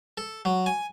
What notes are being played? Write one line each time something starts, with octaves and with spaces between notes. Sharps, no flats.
A4
F#3
G#5